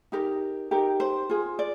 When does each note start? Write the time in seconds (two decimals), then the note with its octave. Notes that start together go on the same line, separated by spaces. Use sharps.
0.12 D#4 G4 A#4
0.71 D#4 G4 A#4
1.00 C5
1.30 F4 G#4
1.59 D5